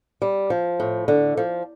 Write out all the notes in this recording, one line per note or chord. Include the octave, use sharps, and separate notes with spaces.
G3
F3
A2
D3
F3